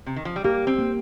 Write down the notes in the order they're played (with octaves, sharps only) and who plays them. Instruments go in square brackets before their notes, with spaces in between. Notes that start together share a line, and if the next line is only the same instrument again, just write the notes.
[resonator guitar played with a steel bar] C3
D#3
F3
G3
[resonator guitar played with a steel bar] A#3 [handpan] G4
[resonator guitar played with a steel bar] C4
[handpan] A#3